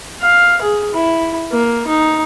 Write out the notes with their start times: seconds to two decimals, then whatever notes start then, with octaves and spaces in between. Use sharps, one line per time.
0.22 F5
0.61 G#4
0.94 E4
1.52 A#3
1.87 D#4